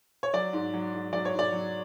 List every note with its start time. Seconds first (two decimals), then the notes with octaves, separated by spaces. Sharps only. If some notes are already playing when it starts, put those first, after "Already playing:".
0.23 C#5
0.33 F#3 D5
0.53 G#2
0.73 F#3
0.94 G#2
1.13 F#3 D5
1.25 C#5
1.33 G#2
1.39 D5
1.53 F#3